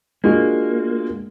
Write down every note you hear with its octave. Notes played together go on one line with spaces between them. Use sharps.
G#3 A#3 D4 F4 F#4